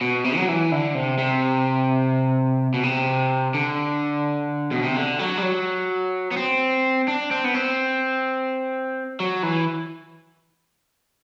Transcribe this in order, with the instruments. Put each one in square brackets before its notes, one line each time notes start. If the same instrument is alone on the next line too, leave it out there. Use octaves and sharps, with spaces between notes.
[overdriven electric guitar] B2
C3
F#3
E3
D3
C3
C3
B2
C3
D3
B2
C3
D3
F#3
G3
F#3
B3
C4
D4
C4
B3
C4
F#3
E3